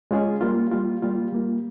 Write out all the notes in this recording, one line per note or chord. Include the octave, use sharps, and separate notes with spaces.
G#3 C#4 F4 G#4
G3 A#3 F4
G3 A#3 F4
G3 A#3 F4
G3 A#3 F4